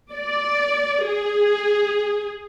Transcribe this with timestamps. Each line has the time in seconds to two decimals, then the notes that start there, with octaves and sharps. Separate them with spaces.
0.13 D5
1.07 G#4